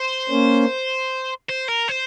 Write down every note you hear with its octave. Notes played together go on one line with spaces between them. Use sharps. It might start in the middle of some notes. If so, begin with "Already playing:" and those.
Already playing: C5
A#3 C#4
C5
A#4
C5